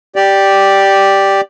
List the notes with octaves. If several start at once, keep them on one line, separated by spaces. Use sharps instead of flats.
G4 D5